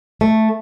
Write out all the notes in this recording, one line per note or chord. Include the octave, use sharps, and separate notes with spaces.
A3